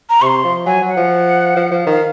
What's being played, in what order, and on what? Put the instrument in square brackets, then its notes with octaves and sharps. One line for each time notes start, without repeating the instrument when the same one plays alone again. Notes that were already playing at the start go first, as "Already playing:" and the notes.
[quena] A#5
[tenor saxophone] C3 [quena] C#6
[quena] C6
[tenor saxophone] F3
[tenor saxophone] F#3 [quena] G#5
[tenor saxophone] F#3
[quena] F#5
[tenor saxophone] F3
F3
F3
D#3
[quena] F5